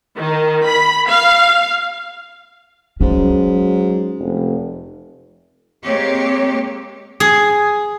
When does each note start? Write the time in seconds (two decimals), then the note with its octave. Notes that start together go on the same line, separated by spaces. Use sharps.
0.17 D#3
0.66 B5
1.08 F5
3.01 G#2 F#3 C#4
4.19 F1
5.84 G#3 A#3 C4 G4 C#5
7.20 G#4